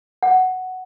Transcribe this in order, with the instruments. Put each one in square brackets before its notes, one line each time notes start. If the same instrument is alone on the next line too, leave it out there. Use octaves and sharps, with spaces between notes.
[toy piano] F#5